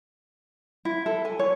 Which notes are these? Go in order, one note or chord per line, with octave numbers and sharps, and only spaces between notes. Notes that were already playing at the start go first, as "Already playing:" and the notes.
E4
A4
G#5
C#5